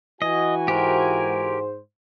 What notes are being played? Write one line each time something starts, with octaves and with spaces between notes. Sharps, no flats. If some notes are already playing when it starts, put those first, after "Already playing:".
E3 F#4 D#5 G#5
G#2 G4 A#4 C5